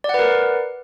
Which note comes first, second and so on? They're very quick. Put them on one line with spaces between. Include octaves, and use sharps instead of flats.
D5 F#5 B4 A#4